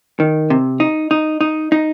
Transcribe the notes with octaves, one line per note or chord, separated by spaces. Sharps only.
D#3
C3
D#4
D#4
D#4
D#4